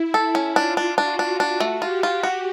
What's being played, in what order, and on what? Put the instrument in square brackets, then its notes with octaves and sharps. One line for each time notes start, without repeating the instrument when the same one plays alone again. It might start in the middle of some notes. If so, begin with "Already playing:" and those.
Already playing: [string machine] E4
[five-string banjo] A4
C#4
[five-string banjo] D4 [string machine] F4
[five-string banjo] D4
[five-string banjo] D4 [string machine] F#4
[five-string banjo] D4
D4
A3
[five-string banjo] F4 [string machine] G4
[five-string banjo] F4
F#4